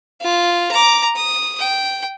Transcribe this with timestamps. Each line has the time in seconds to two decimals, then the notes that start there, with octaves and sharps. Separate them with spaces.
0.22 F4
0.72 A#5 D6
1.16 D#6
1.59 G5